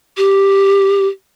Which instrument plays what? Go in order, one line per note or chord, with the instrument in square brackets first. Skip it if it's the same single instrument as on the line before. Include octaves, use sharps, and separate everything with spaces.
[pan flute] G4